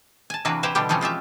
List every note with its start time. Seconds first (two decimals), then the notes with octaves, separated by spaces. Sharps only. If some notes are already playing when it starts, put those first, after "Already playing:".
0.30 G#5 A5
0.45 C3 E3 A#3 D4 F#4 B4
0.63 E4 G4 B4 C5 E5
0.75 B2 D3 G3 D4 G4 G5
0.89 E3 F3 A3 C4 C#4
1.01 G#3 F4 G4 E5